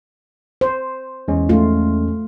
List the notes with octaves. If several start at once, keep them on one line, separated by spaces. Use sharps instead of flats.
C5
E2 G#3 C#4
A3 F4